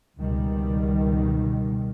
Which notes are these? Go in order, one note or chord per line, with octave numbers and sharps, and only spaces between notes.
C#2 B2 D#3 G3